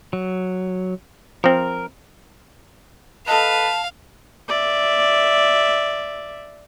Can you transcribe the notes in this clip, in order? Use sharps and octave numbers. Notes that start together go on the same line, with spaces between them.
F#3
F3 C4 A#4
A4 B4 D#5 F5 A5
D5 E5